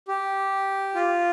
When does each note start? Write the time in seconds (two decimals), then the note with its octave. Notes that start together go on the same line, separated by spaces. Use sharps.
0.08 G4
0.95 F4